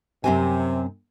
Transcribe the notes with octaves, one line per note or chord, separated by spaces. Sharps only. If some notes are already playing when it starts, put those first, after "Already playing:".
F#2 C3 C4 G#5